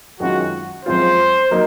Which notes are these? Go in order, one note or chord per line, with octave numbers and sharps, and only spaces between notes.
F#2 D#3 G#3 C#4 F4 F#4
F#2 F3 G#3 C4 F4 C5
F#3 A#3 D#4